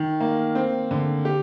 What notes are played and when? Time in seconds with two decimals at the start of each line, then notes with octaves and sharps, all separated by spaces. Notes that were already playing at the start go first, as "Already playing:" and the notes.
Already playing: D#3
0.20 A#3
0.55 C4
0.91 D3
1.25 G4